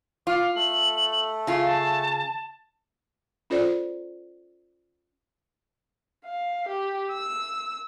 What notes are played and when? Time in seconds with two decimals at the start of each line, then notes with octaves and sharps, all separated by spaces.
0.27 F4 F5 D6
0.56 A3 A4 F#7
1.47 C#3 F4
1.64 A5
3.50 C#4 F4 A4 C5 D5
6.25 F5
6.68 G4
7.12 E6